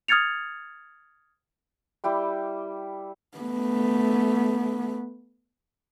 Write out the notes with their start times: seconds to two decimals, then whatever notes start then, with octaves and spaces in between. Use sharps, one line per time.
0.08 D#6 F6 G#6 A6 C#7 F7
2.04 G3 E4 G5 D6
3.38 A3 B3